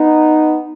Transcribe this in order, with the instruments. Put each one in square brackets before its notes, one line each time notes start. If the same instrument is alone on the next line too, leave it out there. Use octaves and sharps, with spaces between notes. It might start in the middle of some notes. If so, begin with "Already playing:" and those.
Already playing: [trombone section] B3 D#4